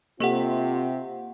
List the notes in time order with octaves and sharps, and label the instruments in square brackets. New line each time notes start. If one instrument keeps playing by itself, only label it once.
[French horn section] C3 C4 [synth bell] A#3 F#5 [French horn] F4 [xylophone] G4 A4